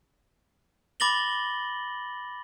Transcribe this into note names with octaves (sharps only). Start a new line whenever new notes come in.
B5 D6 A6 A#6 F#7 G7